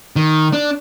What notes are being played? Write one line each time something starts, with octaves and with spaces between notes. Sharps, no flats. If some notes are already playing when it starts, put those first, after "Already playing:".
D#3
D4